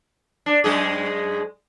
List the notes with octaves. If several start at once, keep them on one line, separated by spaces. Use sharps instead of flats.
D4
F#2 G#3 G#4